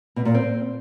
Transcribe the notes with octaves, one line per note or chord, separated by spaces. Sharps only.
B2
A#2
C4